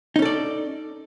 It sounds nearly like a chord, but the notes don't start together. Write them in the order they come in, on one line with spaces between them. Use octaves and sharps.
D#4 C#4 A4 D5